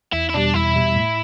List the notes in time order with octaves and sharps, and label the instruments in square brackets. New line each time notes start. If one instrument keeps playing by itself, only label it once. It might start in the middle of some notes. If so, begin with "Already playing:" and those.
[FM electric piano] E2 [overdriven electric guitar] E4
[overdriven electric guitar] E4
[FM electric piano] B2 G3 [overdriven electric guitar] D4
[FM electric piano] E2 [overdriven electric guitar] E4
[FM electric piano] B2 G3
A2